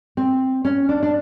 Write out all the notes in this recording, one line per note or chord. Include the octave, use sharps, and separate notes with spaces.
C4
C#4
D4
D4